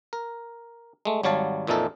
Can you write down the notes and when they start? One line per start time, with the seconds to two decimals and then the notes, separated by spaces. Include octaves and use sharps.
0.13 A#4
1.05 G#3 A3
1.23 G#1 F#3 G3 C#5 F5 A5
1.67 F2 A#2 E3 D#4 A4